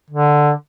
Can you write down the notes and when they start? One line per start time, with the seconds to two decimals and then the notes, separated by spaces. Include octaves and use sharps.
0.10 D3